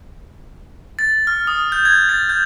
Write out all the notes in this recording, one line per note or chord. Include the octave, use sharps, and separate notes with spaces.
A6
F6
D#6
G6
G#6
A6
G6